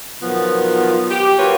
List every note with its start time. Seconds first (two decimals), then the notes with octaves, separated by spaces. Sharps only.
0.22 B2 D#3 F3 F#3 B3
1.10 G4
1.38 F#3 A#3 F4 B4 C#5